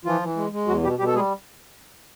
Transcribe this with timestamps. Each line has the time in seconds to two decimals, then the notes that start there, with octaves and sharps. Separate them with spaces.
0.05 E3 F3 F4
0.21 E3
0.36 G#3
0.52 G#3
0.67 E2 F#3 F#4
0.83 B2 G3 G4
0.99 B2 G3 G4
1.07 A4
1.15 G3 G#3 G#4